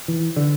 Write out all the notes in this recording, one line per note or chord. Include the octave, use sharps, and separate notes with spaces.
E3
D3